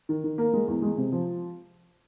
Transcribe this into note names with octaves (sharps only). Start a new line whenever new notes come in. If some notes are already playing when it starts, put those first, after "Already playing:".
D#3
D#3
A#3
G#3
E2
G#3
C3
F3